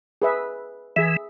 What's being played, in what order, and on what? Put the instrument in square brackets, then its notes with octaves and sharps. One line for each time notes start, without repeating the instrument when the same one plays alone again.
[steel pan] G#4 B4 E5
[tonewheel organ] E3 [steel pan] G#4 E5